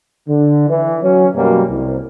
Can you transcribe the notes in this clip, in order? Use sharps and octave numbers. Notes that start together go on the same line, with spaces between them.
D3
E3
F#3 C#4
F#2 B2 F#3 G3 A#3
C2